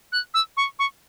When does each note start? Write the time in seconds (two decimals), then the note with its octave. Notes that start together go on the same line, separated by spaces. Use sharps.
0.12 F#6
0.34 E6
0.57 C#6
0.79 C#6